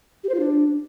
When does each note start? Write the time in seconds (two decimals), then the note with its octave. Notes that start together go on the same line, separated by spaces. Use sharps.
0.24 G4
0.29 C5
0.34 F4
0.40 D4